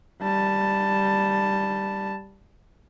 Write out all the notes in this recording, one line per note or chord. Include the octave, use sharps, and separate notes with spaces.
G3 A5